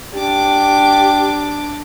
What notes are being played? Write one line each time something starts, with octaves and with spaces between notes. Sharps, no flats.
D4 G4 D6